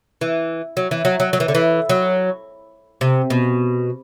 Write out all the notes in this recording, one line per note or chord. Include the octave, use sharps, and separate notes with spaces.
E3
F#3
E3
F#3
F#3
F#3
E3
D3
E3
F#3
C3
B2